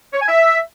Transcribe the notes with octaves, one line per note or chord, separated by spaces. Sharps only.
C#5
G#5
E5